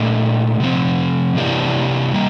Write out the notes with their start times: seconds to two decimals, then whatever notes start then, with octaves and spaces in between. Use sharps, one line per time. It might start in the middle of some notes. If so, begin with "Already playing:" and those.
Already playing: A#2 A3 D4
0.60 C3 F3 C4
1.36 C3 E3 A#3 D4 G4
2.13 G3 A#3